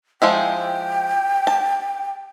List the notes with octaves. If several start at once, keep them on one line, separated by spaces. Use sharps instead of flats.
F3 G#3 E4 G5
A5